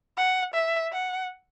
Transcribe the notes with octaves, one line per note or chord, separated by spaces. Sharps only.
F#5
E5
F#5